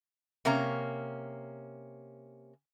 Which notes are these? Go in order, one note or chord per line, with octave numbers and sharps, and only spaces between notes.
C3 A#3 C#4 A#5